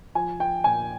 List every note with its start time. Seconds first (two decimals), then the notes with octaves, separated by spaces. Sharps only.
0.15 F3 G#5
0.40 F3 G5
0.64 A#2 G#5